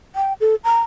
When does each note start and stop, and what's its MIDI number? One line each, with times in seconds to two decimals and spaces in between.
0.16 0.33 79
0.41 0.55 69
0.64 0.80 82